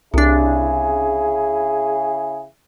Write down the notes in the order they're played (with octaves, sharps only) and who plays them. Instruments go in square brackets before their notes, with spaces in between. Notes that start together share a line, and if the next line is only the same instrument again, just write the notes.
[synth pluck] C2 D4 [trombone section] C#3 E4 G#4